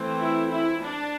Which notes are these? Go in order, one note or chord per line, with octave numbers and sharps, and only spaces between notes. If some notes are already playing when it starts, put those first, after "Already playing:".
Already playing: E3 A3 C4
E4
E4
D4